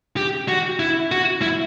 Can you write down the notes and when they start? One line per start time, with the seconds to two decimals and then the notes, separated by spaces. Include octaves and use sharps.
0.17 G4
0.48 F#4
0.79 E4
1.11 F#4
1.42 E4